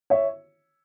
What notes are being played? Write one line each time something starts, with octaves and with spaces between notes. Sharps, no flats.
C#5 E5